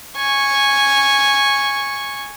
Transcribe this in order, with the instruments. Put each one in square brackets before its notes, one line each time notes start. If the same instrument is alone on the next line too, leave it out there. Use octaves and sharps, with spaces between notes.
[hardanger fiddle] G#5 C#6